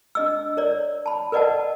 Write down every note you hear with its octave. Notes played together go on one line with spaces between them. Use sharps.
D4 D#5 E6
A#4 C#5 D5
A5 B5
A#4 B4 D5 D#5 F#5 A5